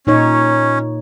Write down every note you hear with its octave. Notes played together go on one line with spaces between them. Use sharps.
A#2 C#4 D#4 C#5